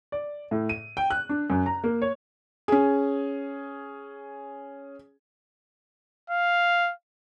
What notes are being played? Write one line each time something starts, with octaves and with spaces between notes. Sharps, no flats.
D5
A2
D#7
G5
F#6
D4
F#2
A#5
A#3
C#5
C#4 G#4
F5